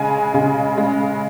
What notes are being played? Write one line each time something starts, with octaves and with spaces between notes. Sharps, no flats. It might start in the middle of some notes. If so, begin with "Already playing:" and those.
Already playing: C#3 G#3 G#5
C#3
G#3